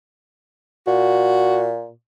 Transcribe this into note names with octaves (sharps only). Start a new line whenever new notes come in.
A#2 F#4